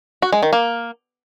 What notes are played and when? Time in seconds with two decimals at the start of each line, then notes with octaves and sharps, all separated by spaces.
0.22 F#4
0.32 G#3
0.43 D#3
0.53 A#3